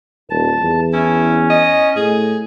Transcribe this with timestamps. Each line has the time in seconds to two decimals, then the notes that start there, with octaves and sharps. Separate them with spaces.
0.30 D#1 A5
0.61 E2
0.93 C#4 E4
1.50 D#5
1.96 A2 G#4